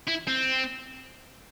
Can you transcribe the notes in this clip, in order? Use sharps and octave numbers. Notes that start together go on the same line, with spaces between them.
E4
C4